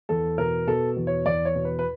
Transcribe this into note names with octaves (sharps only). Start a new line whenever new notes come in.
E2 A4
B2 A#4
B2 A4
E2
C#5
E2 D5
C#5
B2
B4
B4